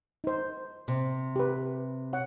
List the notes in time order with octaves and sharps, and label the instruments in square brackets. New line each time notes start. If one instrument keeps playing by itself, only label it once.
[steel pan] D#4 C5
[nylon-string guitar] C3
[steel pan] G4 B4
C#5 F#5